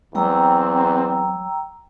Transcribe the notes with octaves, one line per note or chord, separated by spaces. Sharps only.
E2 F#3 C4 G5 A#5 E6